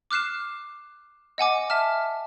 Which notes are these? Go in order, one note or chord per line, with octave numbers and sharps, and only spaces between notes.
D6 F6 F#6 C7 E7
D#5 F#5 G#5 D6
E5 A5 F6